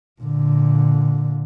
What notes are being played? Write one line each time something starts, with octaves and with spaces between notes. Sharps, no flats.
A#2 D3